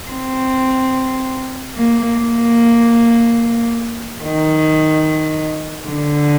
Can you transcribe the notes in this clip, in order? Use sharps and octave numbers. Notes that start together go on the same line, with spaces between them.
C4
A#3
A#3
D#3
D3